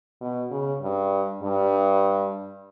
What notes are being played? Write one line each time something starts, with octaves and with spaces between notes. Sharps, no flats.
B2
C#3
G2
G2